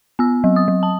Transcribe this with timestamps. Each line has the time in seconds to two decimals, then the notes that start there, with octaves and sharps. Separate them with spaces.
0.19 B3 E6
0.44 F#3
0.56 D#6
0.68 F#3
0.83 A5